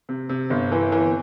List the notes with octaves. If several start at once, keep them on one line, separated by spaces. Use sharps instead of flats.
C3
C3
G1
E3
E3